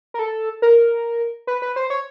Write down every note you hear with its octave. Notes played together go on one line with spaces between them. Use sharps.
A#4
A4
A#4
B4
B4
C5
C#5